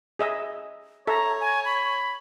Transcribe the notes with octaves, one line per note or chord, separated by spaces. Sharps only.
G#4 D#5 E5
A4 C#5 E5 A#5
G#5
B5